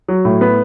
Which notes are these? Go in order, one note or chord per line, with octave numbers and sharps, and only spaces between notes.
F#3
A2
B3